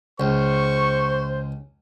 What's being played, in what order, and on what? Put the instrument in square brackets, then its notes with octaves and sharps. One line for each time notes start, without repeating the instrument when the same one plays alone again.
[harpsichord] C#2 [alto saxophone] C5 [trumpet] C#6